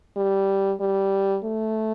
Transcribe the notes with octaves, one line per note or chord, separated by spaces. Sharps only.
G3
G3
A3